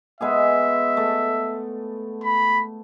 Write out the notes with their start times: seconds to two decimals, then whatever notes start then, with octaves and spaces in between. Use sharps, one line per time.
0.21 G#3 B3 G#4 E5
0.97 A3
2.23 B5